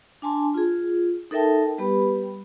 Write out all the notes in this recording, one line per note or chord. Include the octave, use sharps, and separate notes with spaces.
D4 G#5 A5 C6
F4 G#4
D#4 A4 A#4 E5 G5 A5
G3 B3 G4 B4 B5